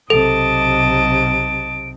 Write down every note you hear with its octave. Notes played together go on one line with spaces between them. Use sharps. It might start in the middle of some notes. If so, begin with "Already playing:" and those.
B1 C3 A4 D#5 A5 D7